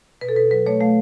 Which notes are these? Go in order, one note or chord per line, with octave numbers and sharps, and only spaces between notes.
B2 B4
A4
B2 B4
F#3 B4
A3 C#5
A3 F5